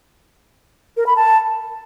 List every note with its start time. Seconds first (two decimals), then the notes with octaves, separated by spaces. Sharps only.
0.97 A#4
1.07 B5
1.16 A5